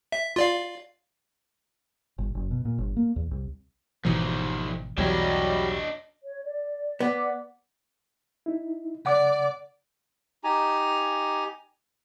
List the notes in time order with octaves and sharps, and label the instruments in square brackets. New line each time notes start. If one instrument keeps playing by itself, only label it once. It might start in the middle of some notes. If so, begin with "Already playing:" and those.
[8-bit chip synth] E5
F4 D5 F5
[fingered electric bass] G1
F#1
B2
A#2
G1
A#3
E2
C2
[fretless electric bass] G#1 B2 E3 [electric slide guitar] F3 D#4
[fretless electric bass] B1 E2 [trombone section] F#3 G3 [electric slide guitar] D4 C#5 D#5
[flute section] C#5
D5
[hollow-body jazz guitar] B3 [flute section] D5 F#5 D6
[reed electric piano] D#4 E4
[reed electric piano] C#3 F#5 D6 [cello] D5
[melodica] D#4 G4 G#5 A#5